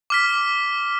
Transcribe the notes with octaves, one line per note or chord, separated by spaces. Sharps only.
D6 F6 B6